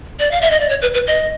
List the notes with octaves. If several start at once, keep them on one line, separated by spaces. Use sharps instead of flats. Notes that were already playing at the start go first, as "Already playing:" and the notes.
D5
F5
E5
D#5
D5
C#5
B4
B4
D#5